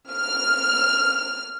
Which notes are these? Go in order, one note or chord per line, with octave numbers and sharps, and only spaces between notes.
F6